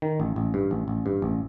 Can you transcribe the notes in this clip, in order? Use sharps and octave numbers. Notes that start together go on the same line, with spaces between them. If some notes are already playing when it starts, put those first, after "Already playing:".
D#3
A1
A1
G2
A1
A1
G2
A1